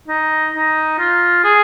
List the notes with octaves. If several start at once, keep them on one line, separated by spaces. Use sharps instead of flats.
D#4
D#4
F4
G#4